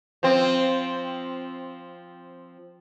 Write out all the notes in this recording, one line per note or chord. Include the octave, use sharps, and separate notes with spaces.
F3 C4